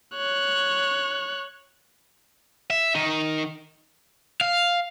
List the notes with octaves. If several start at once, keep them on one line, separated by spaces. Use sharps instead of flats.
C#5 F#6
E5
D#3 D#4
F5